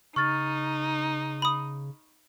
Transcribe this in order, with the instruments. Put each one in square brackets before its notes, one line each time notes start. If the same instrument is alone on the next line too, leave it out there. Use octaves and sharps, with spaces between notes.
[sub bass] C#3 [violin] D#4 [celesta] C#6 F6 A6
[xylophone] B5 D#6